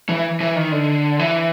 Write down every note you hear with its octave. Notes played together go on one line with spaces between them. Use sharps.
E3
E3
D#3
D3
E3